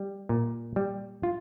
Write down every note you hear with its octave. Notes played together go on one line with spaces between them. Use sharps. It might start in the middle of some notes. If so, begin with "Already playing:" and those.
Already playing: G3
A#2
G3
F4